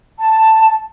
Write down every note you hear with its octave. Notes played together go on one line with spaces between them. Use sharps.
A5